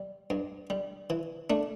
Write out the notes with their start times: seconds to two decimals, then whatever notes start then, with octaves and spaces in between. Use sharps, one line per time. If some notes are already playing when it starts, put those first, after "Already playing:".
Already playing: G3
0.30 G2
0.70 G3
1.10 E3
1.50 A3 D4